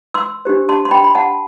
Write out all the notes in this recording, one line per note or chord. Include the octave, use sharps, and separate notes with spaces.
C6 E6
D4 G4 C5
A5 C6
C6
G5 B5
B5
F#5 A5